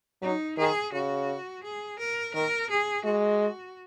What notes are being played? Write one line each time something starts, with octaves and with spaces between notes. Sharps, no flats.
F#3 D#4
D#3 G#4
C#3 F#4
G#4
A#4
D#3 A#4
G#4
G#3 F#4